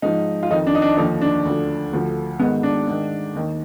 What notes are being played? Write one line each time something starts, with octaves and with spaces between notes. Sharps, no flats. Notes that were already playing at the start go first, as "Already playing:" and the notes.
G#2 F3 D#4
F4
F2 D#3 D#4
D4
D#4
D4
D#2 D3 F3 D#4
D4
D2 D3 F3
D2 D3 F3
G#2 D#3 B3
D4
G#2 D#3
D#2 D#3